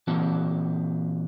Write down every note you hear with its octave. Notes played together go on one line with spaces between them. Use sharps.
A#2 E3 C4 F#4 A5